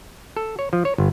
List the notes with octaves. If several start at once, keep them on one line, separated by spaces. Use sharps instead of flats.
A4
C#5
F3
C#5
G1